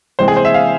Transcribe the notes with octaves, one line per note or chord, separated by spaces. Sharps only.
C3 E3 G#3 C4 C5
G#4
C5
E5
F5